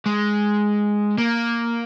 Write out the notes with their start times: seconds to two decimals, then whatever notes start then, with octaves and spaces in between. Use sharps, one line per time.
0.06 G#3
1.18 A#3